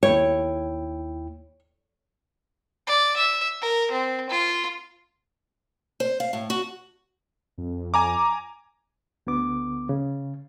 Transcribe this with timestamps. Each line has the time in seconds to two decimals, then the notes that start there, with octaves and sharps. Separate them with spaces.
0.03 D#2 E4 C#5 G5
2.87 D5
3.16 E5
3.62 A#4
3.91 C4
4.29 F4
6.00 C5
6.20 F5
6.33 A2
6.50 F#4
7.58 F2
7.94 G#5 A#5 D6
9.27 D2 D3 B3 D6
9.89 C#3